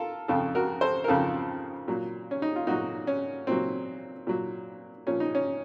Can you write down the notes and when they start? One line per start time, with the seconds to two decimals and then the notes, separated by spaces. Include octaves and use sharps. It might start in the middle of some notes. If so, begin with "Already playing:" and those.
Already playing: F4 A4 A#4
0.28 F2 C#3 F3 F4 A4
0.55 F#4 A#4
0.81 A4 C5
1.04 A#4
1.08 F2 C#3 F3 F4 A4
1.88 A#2 F#3
2.31 C#4
2.42 D#4
2.56 F4
2.67 A#2 F#3 D#4 F#4
3.07 C#4
3.47 A#2 F#3 C4
4.27 A#2 F#3
5.07 A#2 F3 C#4
5.20 D#4
5.35 C#4